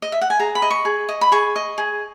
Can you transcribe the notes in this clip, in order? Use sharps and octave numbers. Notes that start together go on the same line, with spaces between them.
D#5
E5
F#5
G#5
G#4 A#5
B5
D#5
C#6
G#4
D#5
B5
G#4 C#6
D#5
G#4